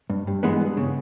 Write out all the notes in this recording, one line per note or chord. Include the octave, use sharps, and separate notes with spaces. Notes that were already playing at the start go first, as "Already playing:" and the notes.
G2
G2
E3 G#3 B3
G2
C#3